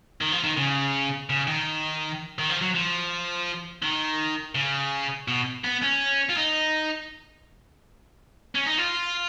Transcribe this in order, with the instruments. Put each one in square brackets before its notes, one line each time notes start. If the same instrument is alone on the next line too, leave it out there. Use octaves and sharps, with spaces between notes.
[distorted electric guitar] D#3
F3
D#3
C#3
C#3
D#3
D#3
F3
F#3
F3
D#3
C#3
B2
B3
C#4
F4
D#4
C#4
D#4
F4